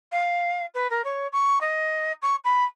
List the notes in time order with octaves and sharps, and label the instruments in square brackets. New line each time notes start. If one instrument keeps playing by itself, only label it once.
[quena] F5
B4
A#4
C#5
C#6
D#5
C#6
B5